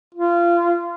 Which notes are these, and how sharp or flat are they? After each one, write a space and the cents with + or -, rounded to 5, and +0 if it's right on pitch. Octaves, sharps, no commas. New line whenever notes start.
F4 -25